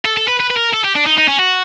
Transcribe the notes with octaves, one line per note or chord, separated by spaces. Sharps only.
A4
A4
B4
B4
B4
A#4
A4
G4
D4
D#4
D#4
C#4
F#4